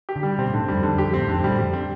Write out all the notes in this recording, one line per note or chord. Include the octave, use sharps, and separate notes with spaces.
G4
D3
G3
B2 C4
A2 D3
G2
F2 G3
F2 D3
E2 G4
F2
A2 C4
F2 D3
A2
G3
A2
F2 G3
C4